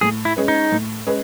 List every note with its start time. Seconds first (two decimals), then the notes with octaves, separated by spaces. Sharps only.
0.01 A2 G#4
0.25 E4
0.37 G#3 C#4 G#4 B4
0.48 D#4
0.72 A2
1.07 G#3 C#4 G#4 B4